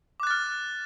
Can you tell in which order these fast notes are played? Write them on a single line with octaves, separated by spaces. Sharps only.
D6 F#6 A6 F6